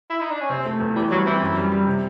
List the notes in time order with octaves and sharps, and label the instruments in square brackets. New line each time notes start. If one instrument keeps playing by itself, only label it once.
[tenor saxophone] E4
D#4
D4
C#4
[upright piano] C3 [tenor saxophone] C4
[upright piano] A3
E2
[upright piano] E3 [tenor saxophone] G3
[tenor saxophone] F#3 [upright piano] G3
[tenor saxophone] E3 [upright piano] C4
[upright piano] F#2
G3
G3
C3